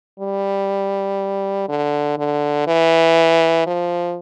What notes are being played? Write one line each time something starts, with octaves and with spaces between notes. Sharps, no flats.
G3
D3
D3
E3
F3